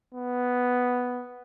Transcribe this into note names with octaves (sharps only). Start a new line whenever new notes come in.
B3